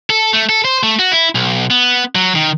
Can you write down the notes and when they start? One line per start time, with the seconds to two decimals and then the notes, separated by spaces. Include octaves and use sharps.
0.10 A4
0.33 A3
0.49 A4
0.65 C5
0.83 A3
0.99 F#4
1.12 E4
1.35 B1
1.70 B3
2.15 F#3
2.35 D#3